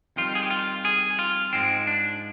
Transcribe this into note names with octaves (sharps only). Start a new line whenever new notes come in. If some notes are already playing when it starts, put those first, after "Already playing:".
F2 D#3 G3 F4
G#4
G4
F4
G#4
F4
G#2 F3 G#3 C4
D4